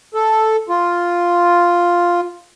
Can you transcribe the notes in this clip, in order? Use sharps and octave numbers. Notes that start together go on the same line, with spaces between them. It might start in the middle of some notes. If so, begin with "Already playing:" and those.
A4
F4